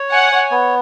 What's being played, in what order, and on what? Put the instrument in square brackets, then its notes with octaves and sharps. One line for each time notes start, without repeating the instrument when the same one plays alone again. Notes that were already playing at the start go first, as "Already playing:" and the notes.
Already playing: [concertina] C#5
[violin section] F#5 [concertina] G#5
[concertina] C#5
B3